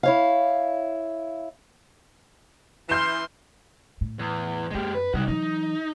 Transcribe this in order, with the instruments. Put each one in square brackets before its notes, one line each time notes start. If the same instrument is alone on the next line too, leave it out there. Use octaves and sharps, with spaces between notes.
[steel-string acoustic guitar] E4 C#5 F5
[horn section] E3 C6 [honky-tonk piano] F6 G6 E7
[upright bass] A2
[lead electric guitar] E2
[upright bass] F#2 B3 [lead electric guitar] G#3 G4
[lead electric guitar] B4
[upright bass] C3 G3 [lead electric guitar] D#4 F#4
[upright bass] E3 F#3 [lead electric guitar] D#4